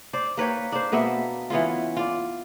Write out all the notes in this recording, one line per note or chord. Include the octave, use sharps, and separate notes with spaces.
C5 D5
A#3 B4 C#5 G5
D4 C5
B2 A#3 B3 E5
E3 B3 C#4 F4
F4 D5